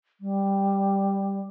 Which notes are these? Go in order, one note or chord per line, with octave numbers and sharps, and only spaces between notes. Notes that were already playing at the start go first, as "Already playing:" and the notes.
G3